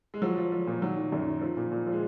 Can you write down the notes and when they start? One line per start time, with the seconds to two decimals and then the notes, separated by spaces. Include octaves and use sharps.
0.14 G#3
0.22 F3 F#3
0.38 F3
0.52 F3
0.67 A#2
0.82 D#3 F#3
0.97 D#3
1.12 F#2
1.27 D#3
1.42 F3
1.57 A#2
1.71 A#2
1.87 F3
1.92 G#3